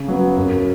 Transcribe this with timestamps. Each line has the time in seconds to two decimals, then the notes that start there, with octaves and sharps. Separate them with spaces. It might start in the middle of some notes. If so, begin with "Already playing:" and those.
Already playing: C#3
0.08 F#3 B3
0.37 F#2